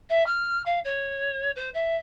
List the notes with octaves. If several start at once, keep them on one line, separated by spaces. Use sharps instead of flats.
E5
F6
F5
C#5
C5
E5